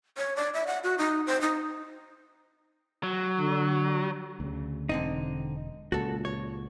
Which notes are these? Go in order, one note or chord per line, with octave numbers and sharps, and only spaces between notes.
C#5
D5
E5
F#5
F#4
D#4
C5
D#4
F#3
D3
D2 C#3
E1 D3 C4 D#4
C#2 A#2 F#4 A4
C#5